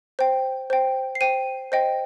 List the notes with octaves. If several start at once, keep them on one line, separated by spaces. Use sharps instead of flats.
C5 G5
C5 G5
C7
C5 G5 D#7
C5 D#5 G5